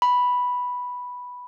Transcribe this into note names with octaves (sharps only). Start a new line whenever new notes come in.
B5